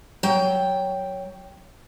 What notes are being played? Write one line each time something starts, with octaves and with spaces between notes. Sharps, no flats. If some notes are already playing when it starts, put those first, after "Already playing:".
F#3 G5